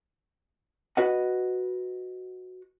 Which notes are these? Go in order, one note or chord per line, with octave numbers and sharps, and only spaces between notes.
F#4 B4 D#5 F#5